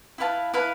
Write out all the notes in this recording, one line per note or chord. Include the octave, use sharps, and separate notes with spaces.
E4 B4 F5 A5
E4 B4 F5 A5